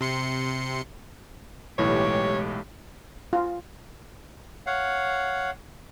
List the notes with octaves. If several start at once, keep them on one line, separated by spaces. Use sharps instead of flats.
C3 C6 C#7
B1 A2 E3 G#3 G4 C#5
F4
C#5 F5 F#5